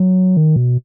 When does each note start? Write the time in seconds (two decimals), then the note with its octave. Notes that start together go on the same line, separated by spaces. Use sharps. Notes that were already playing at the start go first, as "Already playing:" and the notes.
Already playing: F#3
0.37 D#3
0.56 B2